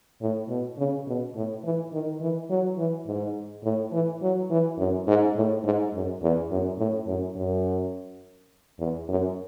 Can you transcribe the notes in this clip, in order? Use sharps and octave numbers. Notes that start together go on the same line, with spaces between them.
A2
B2
C#3
B2
A2
E3
D#3
E3
F#3
E3
G#2
A2
E3
F#3
E3
F#2
G#2
A2
G#2
F#2
E2
F#2
A2
F#2
F#2
E2
F#2